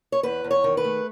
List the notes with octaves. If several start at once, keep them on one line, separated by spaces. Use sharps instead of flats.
C#5
E2 B4
E2
C#5
D#3
B4
A3